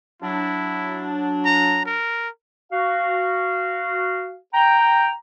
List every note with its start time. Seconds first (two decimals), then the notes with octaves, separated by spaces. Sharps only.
0.22 F#3 D4 E4
1.45 A#5
1.85 A#4
2.72 F#4 F5
4.54 G5 A#5